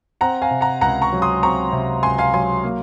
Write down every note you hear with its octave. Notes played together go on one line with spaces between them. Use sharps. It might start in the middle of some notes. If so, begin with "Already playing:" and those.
C4 F#5 A#5
F5 G#5
C3
F#5 A#5
C#2 F#5 A#5
A#5 C#6
F#3
C6 D#6
C4 A#5 C#6
C3
C#2 G#5 C6
F5 G#5
F#3 G#5 C6
A#3